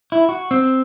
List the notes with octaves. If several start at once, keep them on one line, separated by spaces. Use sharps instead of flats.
E4
F#4
C4